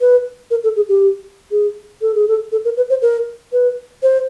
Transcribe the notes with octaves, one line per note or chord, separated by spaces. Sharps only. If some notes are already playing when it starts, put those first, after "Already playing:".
B4
A#4
A4
G#4
G4
G#4
A4
G#4
A4
A4
A#4
B4
C5
A#4
B4
C5